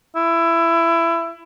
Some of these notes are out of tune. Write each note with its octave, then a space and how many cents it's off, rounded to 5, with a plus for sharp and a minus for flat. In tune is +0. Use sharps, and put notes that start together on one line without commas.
E4 +20